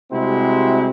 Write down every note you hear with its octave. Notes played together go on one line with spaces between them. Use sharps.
C3 G3 G#3 C4 E4 F#4